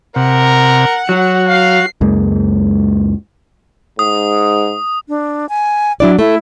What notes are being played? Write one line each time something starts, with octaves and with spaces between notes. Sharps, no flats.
C3 A#4 F#5
F#3 F#4
F5 C7
C#2 F#2 G#3 A#3
G#2 D#6
D4
G#5
F#3 D4 E4 D5
A3 E4